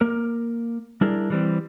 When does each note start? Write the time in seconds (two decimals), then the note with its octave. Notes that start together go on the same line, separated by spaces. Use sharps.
0.01 A#3 A#4
1.01 G3 D4 E4 G#4 A#4
1.30 E3 G3 C4